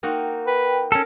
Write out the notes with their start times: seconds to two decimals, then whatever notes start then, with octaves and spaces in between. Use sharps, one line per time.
0.03 A#3 D#4 F#4 G5
0.47 B4 G5
0.92 C#4 A4 A#4 F5